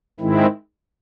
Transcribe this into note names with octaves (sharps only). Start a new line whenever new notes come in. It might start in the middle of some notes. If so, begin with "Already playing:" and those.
G#2 D#3 G#3 C4 E4